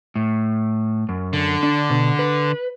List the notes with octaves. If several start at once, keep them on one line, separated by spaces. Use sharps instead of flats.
A2
F#2
D3
D4
B2
B4